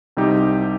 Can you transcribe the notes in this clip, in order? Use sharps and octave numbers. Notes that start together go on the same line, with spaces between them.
C2 C3 G3 D#4 G4